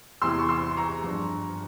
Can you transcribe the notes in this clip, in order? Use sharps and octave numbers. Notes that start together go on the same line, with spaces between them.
E2 C3 E3 C6 E6
C#6
C6 E6
A#5 C#6
G2 F3